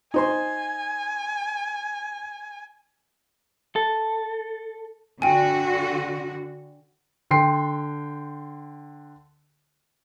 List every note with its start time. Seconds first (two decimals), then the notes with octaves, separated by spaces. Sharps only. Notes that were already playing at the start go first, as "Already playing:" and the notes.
0.14 D#4 C5 G#5 C6
3.76 A4
5.22 D3 F#4 G5 G#5
7.31 D3 G5 C6 C7